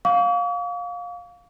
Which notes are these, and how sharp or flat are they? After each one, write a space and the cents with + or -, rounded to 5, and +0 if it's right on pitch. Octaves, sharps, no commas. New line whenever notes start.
F5 +20 C#6 +45